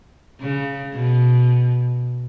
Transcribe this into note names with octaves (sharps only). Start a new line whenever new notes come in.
C#3
B2